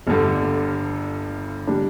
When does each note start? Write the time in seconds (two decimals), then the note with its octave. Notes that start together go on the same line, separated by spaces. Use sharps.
0.07 G1 G2 D3
1.67 G3 D4